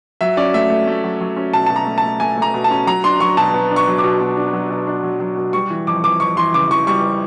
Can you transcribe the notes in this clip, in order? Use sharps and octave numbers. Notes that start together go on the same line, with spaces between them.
F#3 E5
C#4 D5
A3 E5
A3
A3
F#3
F#3
C#4
B2 A5
B2 A5
A#5
A3
A5
A3
A3 G#5
A3 A#5
B2
A5
C#4
F#3 A#5
D4 C6
F#3 C#6
B2 A5
B3
D4
C#6
F#3
D6
B2
B2
D4
F#3
B2
D4
F#3
F#3
B2
G3 C#6
E3
F2 D6
F2 D6
F2 C#6
E3 C6
C#3 D6
E3 C#6
G3 C#6